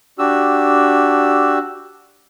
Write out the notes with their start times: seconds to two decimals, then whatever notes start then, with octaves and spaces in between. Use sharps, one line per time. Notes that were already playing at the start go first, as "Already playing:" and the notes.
0.19 D4 F#4 G4 E6